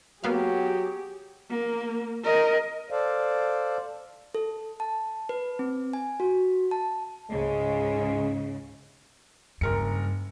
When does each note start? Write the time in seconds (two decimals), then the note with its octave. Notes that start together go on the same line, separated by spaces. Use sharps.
0.24 F#3 A#3 B3 G4 G#4 F5
1.50 A#3
2.24 A#4 D#5
2.91 A4 C5 D5 F5
4.35 A4
4.80 A5
5.29 B4
5.59 C4
5.93 G#5
6.20 F#4
6.71 A5
7.31 C#2 G#2 C#3 G#3
9.61 F#1 G2 A#4 C#7